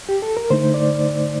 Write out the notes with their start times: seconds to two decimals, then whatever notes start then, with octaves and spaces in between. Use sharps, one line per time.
0.09 G4
0.22 A4
0.37 A#4
0.50 D3 A3 D#4 C5
0.74 D5